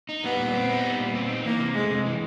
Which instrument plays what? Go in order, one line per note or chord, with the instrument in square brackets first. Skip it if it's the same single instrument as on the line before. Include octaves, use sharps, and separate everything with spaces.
[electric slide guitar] D#4
[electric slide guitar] G3 [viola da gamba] B3
[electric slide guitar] A#2
C4
D#4
G3
A#2
C4
D#4
[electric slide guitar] E3 [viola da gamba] A#3
[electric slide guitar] C3
[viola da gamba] G#3 [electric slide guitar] A3
[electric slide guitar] C3
E3